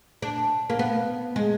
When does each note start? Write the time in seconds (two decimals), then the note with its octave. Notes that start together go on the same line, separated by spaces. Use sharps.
0.22 D4
0.70 A#3
0.79 B3
1.36 G#3